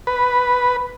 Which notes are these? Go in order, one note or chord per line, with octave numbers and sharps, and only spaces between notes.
B4